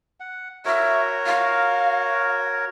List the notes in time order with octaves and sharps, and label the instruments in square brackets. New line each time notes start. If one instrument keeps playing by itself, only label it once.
[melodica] F#5
[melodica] F#4 A#4 C#5 [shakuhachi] E5
[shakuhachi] F5